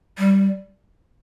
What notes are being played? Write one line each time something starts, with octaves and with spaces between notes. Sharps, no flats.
G3